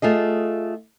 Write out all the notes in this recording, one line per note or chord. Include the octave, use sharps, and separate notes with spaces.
A3 F4 G#4 D#5